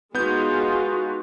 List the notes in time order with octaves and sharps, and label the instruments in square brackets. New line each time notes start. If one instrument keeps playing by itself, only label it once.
[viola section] G#3 D#4 F4 [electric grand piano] B3 G6 [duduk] F#4